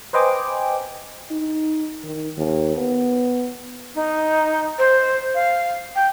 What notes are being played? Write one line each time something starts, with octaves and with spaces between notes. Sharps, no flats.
B4 C5 D#5 G5 G#5 D6
D#4
D#3
D#2
B3
D#4
C5
F5
G5